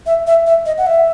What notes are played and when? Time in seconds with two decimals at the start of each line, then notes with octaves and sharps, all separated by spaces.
0.06 E5
0.27 E5
0.46 E5
0.66 D#5
0.78 F#5
0.87 E5